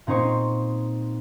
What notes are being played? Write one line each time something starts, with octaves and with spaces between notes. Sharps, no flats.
A#2 C4 D#4 C5 C#6